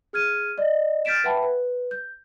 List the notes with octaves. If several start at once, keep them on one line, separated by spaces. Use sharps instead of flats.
G#4 F6 G#6 D#7
D5 D#5
F6 G6 A6 B6 D7 E7
B4 E5 F#5 G5 A5 B5
B4
G6